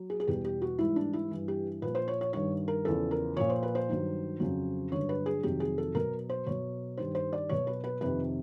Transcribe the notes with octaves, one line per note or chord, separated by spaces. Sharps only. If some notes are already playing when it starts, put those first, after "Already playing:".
Already playing: F#3
G#4
G#4
E2 B2 G3 G4
G4
F#4
G#2 E3 G3 E4
D4
E4
G2 E3 G3
G4
A#2 F3 B4
C5
C#5
C#5
G2 D#3 G3 C#5
A#4
E2 C#3 F3 A4
A#4
A#2 F3 C#5
C5
B4
C5
G2 D#3 F#3
F2 C#3 F#3
G2 D3 F#3 C#5
B4
G#4
F2 C3 D#3 F#3 G4
G#4
A4
B2 F#3 A#4
C5
B2 F#3 C#5
G2 D#3 G3 C5
C5
D5
B2 F#3 C#5
B4
B4
F2 C3 D#3 B4